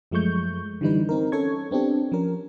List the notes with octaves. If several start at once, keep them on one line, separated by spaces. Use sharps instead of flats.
F#2 F3 G#3 A3 C#6 G6
D3 E3 G3 D#4 B4
C4 D#4 A#4
C#4 A4 C#5 C#6 G#6
B3 C4 D4 G4 A4
F3 C#4 A#4